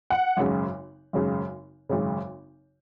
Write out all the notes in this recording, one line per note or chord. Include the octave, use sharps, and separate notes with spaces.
F#5
G#1 F#2 C#3
G#1 F#2 C#3
G#1 F#2 C#3